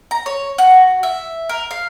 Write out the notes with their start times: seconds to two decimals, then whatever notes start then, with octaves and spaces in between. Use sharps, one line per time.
0.11 A#5
0.26 C#5
0.58 F#4
1.03 E5
1.49 A#4
1.71 F5